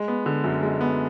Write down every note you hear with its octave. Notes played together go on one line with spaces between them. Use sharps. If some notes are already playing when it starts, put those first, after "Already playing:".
Already playing: G#3
B3
D3
F#2
G#3
B3